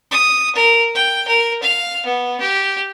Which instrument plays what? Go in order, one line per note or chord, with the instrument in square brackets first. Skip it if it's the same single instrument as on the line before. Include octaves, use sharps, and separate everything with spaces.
[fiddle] D#6
A#4
G5
A#4
F5
B3
G4